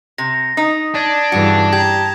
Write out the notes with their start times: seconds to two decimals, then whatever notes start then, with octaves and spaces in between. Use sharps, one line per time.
0.18 C3 A#6
0.57 D#4 D#6
0.95 D4 A5 G#6
1.32 G2 C#3 E3 F#4
1.73 G4 A5 A#5 G#6